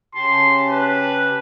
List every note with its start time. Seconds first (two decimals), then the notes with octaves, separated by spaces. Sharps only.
0.15 C#3 G4 A5 C6
0.70 B4